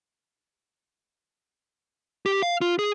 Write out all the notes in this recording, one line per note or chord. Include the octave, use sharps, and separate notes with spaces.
G4
F5
F4
G#4